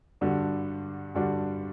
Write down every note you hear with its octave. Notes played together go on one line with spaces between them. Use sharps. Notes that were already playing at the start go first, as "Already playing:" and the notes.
G2 D3 G3 D4 F#4
G2 D3 G3 D4 F#4